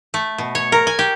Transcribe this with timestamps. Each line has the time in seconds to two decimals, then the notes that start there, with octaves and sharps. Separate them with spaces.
0.14 A3
0.38 B2
0.55 C#5
0.72 A#4
0.87 G#5
0.99 G4